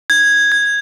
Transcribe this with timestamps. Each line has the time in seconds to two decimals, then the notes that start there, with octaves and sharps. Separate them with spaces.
0.10 G#6
0.52 G#6